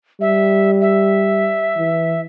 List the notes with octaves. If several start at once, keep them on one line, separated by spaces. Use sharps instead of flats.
G3 E5
E5
E3